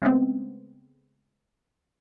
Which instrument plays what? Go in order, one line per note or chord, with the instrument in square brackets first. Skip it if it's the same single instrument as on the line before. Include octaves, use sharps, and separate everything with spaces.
[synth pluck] C#3 G#3 A3 B3 C4